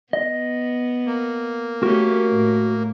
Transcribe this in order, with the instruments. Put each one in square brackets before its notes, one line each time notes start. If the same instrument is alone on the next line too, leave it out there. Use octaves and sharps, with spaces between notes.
[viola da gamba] B3 [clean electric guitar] D#5
[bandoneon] A#3
[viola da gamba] A3 C#4 G4 [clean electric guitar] F#4 A#4
[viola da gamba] A2